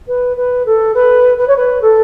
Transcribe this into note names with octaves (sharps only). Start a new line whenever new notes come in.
B4
B4
A4
B4
B4
C#5
B4
A4